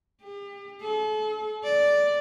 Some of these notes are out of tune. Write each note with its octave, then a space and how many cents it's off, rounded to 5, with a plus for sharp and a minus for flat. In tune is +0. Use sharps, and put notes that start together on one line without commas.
G4 +40
A4 -40
D5 -5